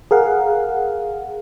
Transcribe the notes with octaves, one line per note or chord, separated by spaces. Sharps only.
G#4 A#4 F5 F#5